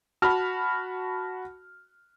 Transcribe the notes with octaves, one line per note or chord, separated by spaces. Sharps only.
F#4 A5 B5 F6